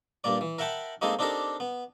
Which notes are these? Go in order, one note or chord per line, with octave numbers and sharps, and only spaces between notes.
G2 A#2 A#3 D5
E3
A#4 E5 F#5 G5 A5 B5
G#3 A#3 C4 D#4 G#4 A4
C4 D4 D#4 G4 A4 A#4
B3